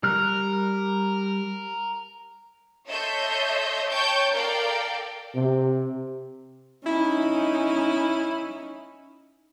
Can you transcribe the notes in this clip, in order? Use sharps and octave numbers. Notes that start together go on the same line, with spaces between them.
G3 A#4 F6 F#6
A4 C#5 D#5 E5 C6 G6
C#5 G5 A5 C#6 G6
A4 A#4 D5 F5 G5
C3
C#4 D#4 E4